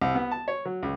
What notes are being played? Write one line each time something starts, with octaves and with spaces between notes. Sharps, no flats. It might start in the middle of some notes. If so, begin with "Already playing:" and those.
C2
B3
A5
C#5
F#3
C#2